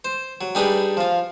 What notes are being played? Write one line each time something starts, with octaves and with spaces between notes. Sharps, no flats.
C5
F#3
G3 D4 D#4 G#4 B4
F3 F4